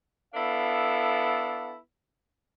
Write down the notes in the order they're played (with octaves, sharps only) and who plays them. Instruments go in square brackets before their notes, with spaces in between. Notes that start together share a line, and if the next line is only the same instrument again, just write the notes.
[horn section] B3 D4 E4 A4 F5